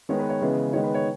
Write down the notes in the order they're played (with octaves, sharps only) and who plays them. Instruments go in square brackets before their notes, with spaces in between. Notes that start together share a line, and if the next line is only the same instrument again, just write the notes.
[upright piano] D#3 G#3 B3 C#5
B4
C#5
C#3 E3 G#3 B3
D#3 G#3 B3 C#5
B4
C#5